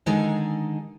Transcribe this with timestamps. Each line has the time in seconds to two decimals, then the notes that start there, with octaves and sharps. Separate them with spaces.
0.06 D3 D#3 G#3 D#4 G#4 A4